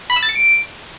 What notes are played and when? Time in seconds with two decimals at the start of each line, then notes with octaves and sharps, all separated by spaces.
0.10 B5
0.16 E6
0.23 A6
0.29 C#7
0.35 D7